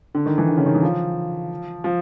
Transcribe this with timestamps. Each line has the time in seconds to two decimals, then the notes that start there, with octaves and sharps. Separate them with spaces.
0.15 D3
0.26 D#3
0.38 E3
0.48 D3
0.57 C#3
0.66 D#3
0.75 E3
0.83 F3
1.84 F3